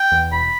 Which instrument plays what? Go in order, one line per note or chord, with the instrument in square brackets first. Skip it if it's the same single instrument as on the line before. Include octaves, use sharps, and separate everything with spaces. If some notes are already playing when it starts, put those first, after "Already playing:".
Already playing: [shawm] G5
[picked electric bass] E2
[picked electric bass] E1 [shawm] B5